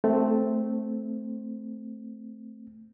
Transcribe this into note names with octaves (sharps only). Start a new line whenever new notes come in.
A3 C4